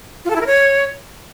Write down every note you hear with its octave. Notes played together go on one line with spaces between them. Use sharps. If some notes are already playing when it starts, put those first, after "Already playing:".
F4
A4
E4
A#4
C#5